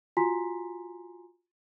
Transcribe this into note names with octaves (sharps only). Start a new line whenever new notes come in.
F4 F#4 G#5 A#5 C6 B6